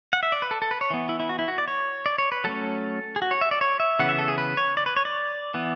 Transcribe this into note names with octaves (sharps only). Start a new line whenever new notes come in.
F#5
E5
D5
B4
A4
A4
B4
C#5
E3 B3
E4
E4
F#4
E4
F#4
D5
C#5
D5
C#5
B4
F#3 A3 C#4 A4
G#4
F#4
C#5
E5
D5
C#5
E5
C#3 E3 B3 F#5
E5
A4
G#4
B4
C#5
D5
B4
C#5
D5
E3 B3